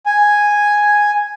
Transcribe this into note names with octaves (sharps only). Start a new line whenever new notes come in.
G#5